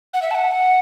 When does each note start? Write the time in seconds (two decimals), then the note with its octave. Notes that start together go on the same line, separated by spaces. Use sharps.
0.14 F#5
0.22 E5
0.31 A5
0.35 F#5